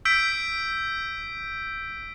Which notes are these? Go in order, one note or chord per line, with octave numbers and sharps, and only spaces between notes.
E6 G6 B6 D7